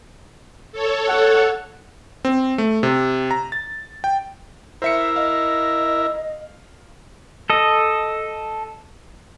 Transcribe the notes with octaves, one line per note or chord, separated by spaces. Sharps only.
A4 C#5
F#5
C4
A3
C3
A#5
A6
G5
E4 A#4 C5 E5 C#7
D#5 F5
A4 D#5